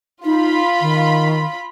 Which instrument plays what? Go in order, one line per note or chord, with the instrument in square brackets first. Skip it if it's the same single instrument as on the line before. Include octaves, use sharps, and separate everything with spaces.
[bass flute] D#4 [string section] F4 B5
[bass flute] D#3